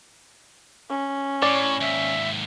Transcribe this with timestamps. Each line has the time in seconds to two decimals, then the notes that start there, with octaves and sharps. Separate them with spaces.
0.90 C#4
1.42 A2 C#5 D5
1.81 D#2 G#2 E5